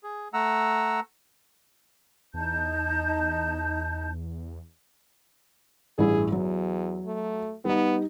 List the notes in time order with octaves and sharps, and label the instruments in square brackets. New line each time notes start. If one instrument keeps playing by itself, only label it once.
[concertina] G#4
A3 F#5 A#5 E6
[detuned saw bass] E2 [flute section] D#4 A5 G6
[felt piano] A1 G2 E4 [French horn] G#4
[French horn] E2 [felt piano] F#3
[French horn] A3
[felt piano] G3 D#4 [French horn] B3